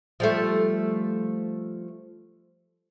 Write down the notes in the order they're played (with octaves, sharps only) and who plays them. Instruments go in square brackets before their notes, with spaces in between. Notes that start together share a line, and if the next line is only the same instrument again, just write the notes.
[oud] F3 G3 A3